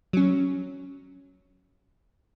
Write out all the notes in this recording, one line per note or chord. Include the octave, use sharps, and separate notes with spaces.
F#3 C#4